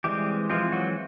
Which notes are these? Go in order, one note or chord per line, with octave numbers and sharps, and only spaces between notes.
E3 G3 G#3 C4 G4
E3 F3 G#3 C4 F4
F#3 F#4